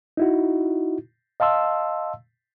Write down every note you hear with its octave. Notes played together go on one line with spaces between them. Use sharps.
D#4 E4 F#4
D#5 F5 A5 C6 E6